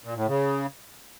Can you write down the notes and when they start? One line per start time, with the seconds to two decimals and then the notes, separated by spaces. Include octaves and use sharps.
0.04 A#2
0.16 A2
0.27 C#3